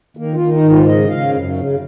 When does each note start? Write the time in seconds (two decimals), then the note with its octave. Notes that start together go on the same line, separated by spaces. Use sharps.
0.17 D#3 A#3
0.34 F4
0.40 D#3
0.51 D#4
0.63 G#2
0.70 F4
0.86 C#3 D#5
1.10 C#3 F5
1.33 F#2
1.57 C#3